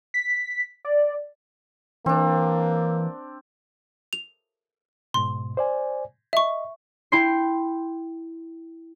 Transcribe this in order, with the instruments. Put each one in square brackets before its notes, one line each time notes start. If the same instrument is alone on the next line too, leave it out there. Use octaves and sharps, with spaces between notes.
[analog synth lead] B6
D5
[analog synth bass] E3 [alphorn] A#3 [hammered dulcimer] C4 D4
[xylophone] F7
[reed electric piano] G#2 B2 [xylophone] C6
[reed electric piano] C5 D5 G#5
[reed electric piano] D#5 [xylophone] E5 C#6
[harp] E4 G5 C6 C7